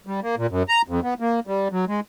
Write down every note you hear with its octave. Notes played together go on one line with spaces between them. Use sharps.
G3
A#3
A#2
F#2
A#5
F2
B3
A#3
G3
F#3
G#3